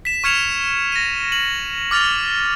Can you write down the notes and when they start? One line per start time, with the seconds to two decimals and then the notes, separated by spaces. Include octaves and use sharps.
0.05 B6 E7
0.24 C#6 F6 G#6 C#7 E7 F7
0.92 A#6 D#7
1.32 F#7
1.91 D6 F6 A6 F7